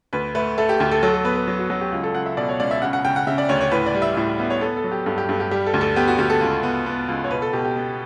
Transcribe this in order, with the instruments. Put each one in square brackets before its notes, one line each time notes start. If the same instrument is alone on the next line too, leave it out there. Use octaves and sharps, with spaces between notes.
[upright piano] D2 B4
A3 B4
A3 A4
G4
D2 G4
A4
F#3 A4
A4
B3 B4
B4
F#3
F#4
F#3 F#4
G4
C#2
A4
C#2 F#5
E5
B2 D5
C#5
C#2 D5
E5
C#3 F#5
F#5
C#3 G5
F#5
C#3 E5
D5
D2 C#5
C#5
A2 B4
D5
G3
E5
A2 E5
B3 E5
C#5
B3 A4
A4
F#3
G4
G2 A4
G4
G2 A4
G4
G3 G4
A4
D2
A4
B3 G4
F#4
D2 G4
A4
C#2
B3
B3
C#2
C#5
B2 B4
A4
B2 G4
G4
B3